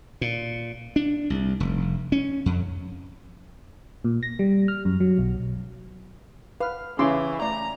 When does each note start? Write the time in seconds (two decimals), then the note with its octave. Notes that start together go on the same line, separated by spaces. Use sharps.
0.21 A#2
0.96 D4
1.30 C2
1.60 F1
2.12 C#4
2.46 F2
4.04 A#2
4.23 A#6
4.39 G3
4.68 F6
4.85 F#2
5.00 F#3
5.18 B1
6.60 B4 F5 F6
6.99 C#3 E3 C#4 C6 D6 E6
7.42 A3 D5 A#5